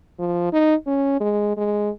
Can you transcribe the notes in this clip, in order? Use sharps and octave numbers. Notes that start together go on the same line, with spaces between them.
F3
D#4
C#4
G#3
G#3